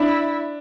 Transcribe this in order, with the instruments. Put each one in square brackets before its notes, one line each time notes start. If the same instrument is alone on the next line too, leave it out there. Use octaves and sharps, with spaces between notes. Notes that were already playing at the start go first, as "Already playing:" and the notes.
Already playing: [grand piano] D4 [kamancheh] E4